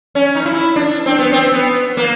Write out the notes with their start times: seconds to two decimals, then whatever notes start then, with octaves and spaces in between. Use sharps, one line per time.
0.15 C#4
0.35 D#4
0.46 E4
0.76 D4
1.06 C4
1.19 B3
1.32 C4
1.52 B3
1.97 A#3